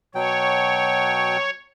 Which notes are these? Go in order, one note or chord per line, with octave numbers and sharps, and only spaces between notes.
B2 F#3 C#5 G5